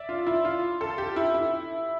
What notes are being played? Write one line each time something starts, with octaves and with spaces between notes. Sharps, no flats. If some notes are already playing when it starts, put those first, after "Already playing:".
Already playing: D5 E5
F4
E4
F4
A4
G4
E4
E4